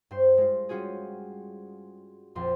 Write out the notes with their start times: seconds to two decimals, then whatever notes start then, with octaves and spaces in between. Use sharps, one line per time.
0.11 G2 C5
0.37 G#3 F4
0.69 G3 C#4 F4 F#4 G#4
2.35 A#1 F2 C6